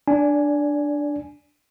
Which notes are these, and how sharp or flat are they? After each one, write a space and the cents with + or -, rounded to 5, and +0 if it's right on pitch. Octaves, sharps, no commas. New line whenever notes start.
D4 +5 D5 -20 G#5 +0